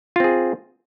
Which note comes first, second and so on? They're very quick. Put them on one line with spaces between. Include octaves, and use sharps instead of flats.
F4 C4 G#4